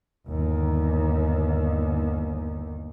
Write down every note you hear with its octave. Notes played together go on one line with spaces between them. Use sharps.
G1 D#2